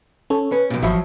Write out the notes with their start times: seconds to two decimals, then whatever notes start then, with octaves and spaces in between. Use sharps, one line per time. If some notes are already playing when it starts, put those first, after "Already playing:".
0.30 C#4 A4 C#5
0.52 C#4 B4
0.70 B1 A#2
0.82 G#1 F3 F#3 E5 B5